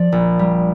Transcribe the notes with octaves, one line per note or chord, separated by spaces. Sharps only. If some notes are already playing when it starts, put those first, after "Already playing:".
Already playing: F3 D5
A#1
G3